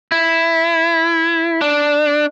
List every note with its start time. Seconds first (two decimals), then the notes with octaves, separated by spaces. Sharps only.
0.12 E4
1.61 D4